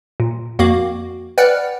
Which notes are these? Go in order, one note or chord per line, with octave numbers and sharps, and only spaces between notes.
A#2
F2 A#3 F#4 D6
B4 D5 F#5 G5 F6 F#6